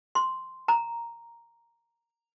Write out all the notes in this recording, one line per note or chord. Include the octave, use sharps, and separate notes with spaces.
C6
A#5